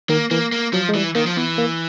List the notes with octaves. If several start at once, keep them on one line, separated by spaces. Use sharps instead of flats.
D#3 A#3
E3 A#3
A#3
F3 F#3
G#3
E3 G3
D#3 A#3
F3
E3 B3
A#3